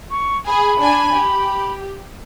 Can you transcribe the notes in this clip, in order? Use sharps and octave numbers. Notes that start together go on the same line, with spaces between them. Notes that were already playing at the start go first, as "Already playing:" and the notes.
C#6
G#4 B5
D4 G#5
G4